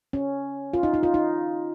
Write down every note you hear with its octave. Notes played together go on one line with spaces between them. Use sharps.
C#4
F4
D#4
D#4
F4
D#4